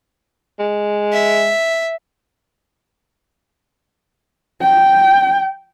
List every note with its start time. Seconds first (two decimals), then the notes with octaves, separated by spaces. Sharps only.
0.59 G#3
1.13 E5
4.62 G5